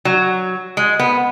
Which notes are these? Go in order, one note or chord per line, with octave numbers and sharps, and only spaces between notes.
F#3
G#3
B3